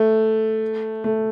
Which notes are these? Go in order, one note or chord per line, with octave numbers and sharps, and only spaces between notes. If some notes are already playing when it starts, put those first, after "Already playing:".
Already playing: A3
A3